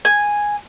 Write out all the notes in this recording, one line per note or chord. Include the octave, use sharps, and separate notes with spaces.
G#5